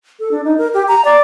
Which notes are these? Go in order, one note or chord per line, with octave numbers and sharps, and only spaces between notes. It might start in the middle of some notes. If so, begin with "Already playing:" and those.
A4
D4
D#4
A#4
G4
A#5
D5